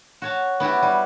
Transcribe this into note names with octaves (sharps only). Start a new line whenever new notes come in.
F#4 C#5 A5
B3 E4 F#4 G4
G3